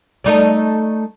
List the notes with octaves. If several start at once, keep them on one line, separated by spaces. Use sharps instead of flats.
A3 D#4 D5